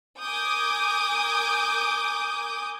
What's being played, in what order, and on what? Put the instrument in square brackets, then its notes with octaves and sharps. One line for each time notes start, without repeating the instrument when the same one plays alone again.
[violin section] A#4 G#5 D6 D#6 G6